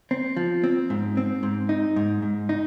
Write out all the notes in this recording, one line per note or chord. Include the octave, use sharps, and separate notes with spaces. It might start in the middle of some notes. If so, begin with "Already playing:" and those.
C4
F3
C4
G#2
C4
G#2
D#4
G#2
G#2
D#4